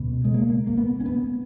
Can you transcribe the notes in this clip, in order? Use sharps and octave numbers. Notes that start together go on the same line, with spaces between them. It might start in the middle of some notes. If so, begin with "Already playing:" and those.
Already playing: C#2 B2
G#3
A#3
A#3
B3
C#4
B3